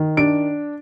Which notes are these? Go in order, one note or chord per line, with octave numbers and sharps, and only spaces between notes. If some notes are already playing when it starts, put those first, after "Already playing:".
Already playing: D#3
D4 D7